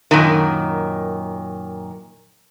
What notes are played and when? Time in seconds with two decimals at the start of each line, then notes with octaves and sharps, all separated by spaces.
0.11 F#2 A#2 D#3